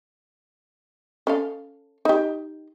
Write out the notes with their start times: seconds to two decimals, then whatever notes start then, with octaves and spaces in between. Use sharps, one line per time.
1.27 C#4 A4 F5
2.05 D#4 G4